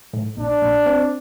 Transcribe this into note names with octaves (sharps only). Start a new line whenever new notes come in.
A2
A#1 D4
A#1
C4